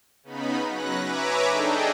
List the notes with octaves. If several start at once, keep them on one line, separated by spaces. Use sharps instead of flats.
C#3 B3 D#4 B5
F#3 C#4 B4 F#6 A#6
B4 C#5 E5 G#5 A#5 D6
D4 D#4 G#4 A4 D#5 G5